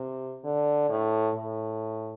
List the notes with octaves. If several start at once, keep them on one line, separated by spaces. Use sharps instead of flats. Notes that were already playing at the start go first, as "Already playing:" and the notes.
Already playing: C3
D3
A2
A2